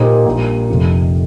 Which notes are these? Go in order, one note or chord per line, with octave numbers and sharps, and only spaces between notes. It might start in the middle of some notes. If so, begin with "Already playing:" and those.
Already playing: A#2 A#3 D#4 G4 C5
A#1 A#2 G3 A#3
F1 F2 C3 F3